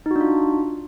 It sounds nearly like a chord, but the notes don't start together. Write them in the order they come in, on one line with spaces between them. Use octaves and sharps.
D#4 F#4 D4 F4